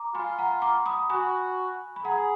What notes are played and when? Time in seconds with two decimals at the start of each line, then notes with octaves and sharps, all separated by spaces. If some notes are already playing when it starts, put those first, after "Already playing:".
Already playing: A#5 D6
0.14 F4 G#5 B5
0.39 F#5 A#5
0.62 A#5 D6
0.86 B5 D#6
1.10 F#4 G#5 B5
1.96 B5
2.05 G#4 F#5 A#5